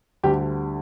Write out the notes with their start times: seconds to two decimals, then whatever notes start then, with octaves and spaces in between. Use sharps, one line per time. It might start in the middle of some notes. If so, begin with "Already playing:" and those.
0.23 D2 D3 G3 G4